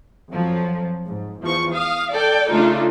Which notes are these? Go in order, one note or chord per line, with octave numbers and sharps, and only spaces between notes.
F2 F3 F#3
G#2
E2 F3 C#6
F5 D#6
A4 D5 G5
C#3 A3 D4 D#4 F4 A4